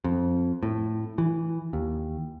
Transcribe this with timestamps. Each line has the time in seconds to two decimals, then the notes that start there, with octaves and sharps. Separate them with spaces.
0.04 F2
0.63 A2
1.18 E3
1.73 D#2